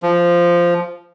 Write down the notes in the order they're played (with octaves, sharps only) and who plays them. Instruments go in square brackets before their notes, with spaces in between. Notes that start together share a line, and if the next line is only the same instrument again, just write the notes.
[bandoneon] F3